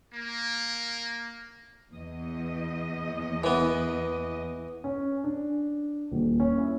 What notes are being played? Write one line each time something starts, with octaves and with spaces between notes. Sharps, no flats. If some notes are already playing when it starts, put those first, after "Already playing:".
A#3
E2 D#5
E3 B3
C#4
D4
D#1
C#4
E4